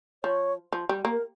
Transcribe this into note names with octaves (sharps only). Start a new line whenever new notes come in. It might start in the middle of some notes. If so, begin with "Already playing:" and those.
F3 C#5
F3
G3
A#3
A#4